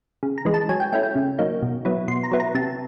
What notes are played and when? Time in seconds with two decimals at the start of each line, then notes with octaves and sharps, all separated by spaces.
0.23 C#3
0.38 A#5
0.45 E3 G#3
0.54 A5
0.69 F#3 G#5
0.80 G5
0.92 A3 C#4 E4 G5
1.03 G5
1.16 C#3
1.39 F#3 A#3 D#4
1.62 B2
1.85 F#3 B3 E4
2.08 B2 C6
2.23 A#5
2.31 F#3 B3 E4
2.40 A#5
2.55 C3 A5